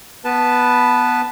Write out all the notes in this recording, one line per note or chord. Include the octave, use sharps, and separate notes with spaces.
B3 B4 A5